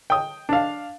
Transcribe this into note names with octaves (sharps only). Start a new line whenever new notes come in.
G5 D#6
D4 F5